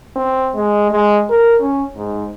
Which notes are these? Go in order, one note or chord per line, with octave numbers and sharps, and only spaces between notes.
C4
G#3
G#3
A#4
C#4
G#2